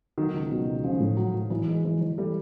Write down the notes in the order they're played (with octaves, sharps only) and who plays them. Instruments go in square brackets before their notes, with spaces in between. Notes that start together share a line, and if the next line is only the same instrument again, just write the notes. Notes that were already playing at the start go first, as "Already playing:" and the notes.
[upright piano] D#3 [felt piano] F#3
[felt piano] C#2
[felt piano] B2 [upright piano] F#3
[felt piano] C#2
[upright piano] F3 [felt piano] C#4
[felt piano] A2
F#3
A2
[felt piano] E3 [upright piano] F#3
[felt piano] G#3
E3
E3
[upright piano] G3 [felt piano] A3